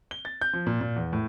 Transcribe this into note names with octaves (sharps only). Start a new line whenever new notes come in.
G7
A6
G6
F3
A#2
A#2
E2
A2